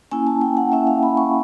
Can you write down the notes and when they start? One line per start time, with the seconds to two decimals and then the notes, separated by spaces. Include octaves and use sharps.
0.11 A#3 C#4 E4 G#5
0.27 A5
0.41 G5
0.57 F#5
0.72 A#3 C#4 E4 E5
0.87 F5
1.03 B5
1.17 C#6